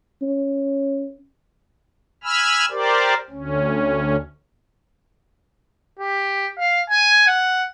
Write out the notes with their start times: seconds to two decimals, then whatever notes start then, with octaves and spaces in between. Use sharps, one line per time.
0.22 C#4
2.24 G#5 B5 E6 F6
2.71 G4 A#4 C5 D5
3.30 D2 C#4
5.99 G4
6.59 F5
6.90 G#5
7.27 F#5